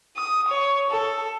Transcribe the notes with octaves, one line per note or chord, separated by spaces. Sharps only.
D#6
C#5
A4